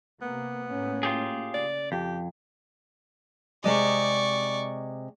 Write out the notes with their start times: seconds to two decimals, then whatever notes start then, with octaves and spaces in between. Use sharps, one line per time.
0.22 C3 A#3 B3
0.71 A2 A#3 C#4
1.03 F4 G4 G#4
1.54 C#3 D5
1.92 F2 G4
3.64 C3 G#3 D5 D#5 C#6